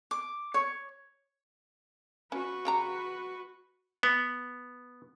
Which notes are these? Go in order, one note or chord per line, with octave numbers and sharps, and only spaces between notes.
D6
C#5
C#4 F#4 B4
C#3 G4 A#5
B3